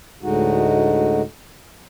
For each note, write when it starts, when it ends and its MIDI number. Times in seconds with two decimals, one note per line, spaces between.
0.23 1.22 38
0.23 1.22 45
0.23 1.22 50
0.23 1.22 56
0.23 1.22 63
0.23 1.22 66